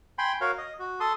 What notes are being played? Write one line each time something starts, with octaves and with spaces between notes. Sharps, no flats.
G5 G#5 B5 C6
F#4 A#4 C#5 F5
D#5
F#4
A4 A5 C6 D#6